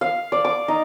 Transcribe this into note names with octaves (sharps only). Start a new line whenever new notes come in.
F5
D5
D6
D#4